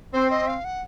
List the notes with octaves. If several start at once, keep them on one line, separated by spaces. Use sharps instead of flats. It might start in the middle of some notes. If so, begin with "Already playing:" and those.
C4 C5
D#5
F5
F#5